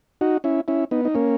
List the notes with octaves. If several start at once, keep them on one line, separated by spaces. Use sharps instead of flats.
D#4 F#4
C#4 E4
C#4 E4
B3 D#4
D#4
A#3 C#4